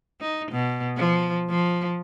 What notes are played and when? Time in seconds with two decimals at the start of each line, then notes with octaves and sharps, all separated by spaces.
0.21 D#4
0.52 B2
0.97 F3
1.49 F3